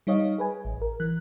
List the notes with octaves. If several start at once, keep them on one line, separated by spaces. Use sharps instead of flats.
G3 D#4 C#5 D#5 F5
G#4 B4 G#5
A1
A#4
E3 F#6